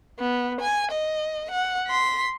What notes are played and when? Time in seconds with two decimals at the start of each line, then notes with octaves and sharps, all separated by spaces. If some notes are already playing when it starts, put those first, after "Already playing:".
0.19 B3
0.61 G#5
0.92 D#5
1.51 F#5
1.88 C6 B6